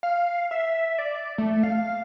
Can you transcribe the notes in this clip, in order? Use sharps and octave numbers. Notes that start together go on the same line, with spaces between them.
F5
E5
D5
A3
F5